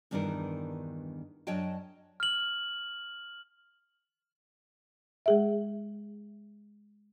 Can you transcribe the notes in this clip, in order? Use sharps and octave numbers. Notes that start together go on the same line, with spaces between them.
E2 G2 D#3 D4 E4 A#4
F#2 D4 C#5 D#5 G5 A5
F6 F#7
G#3 G#4 E5